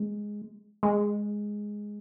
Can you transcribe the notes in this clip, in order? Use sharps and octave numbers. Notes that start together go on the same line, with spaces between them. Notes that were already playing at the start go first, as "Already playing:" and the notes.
Already playing: G#3
G#3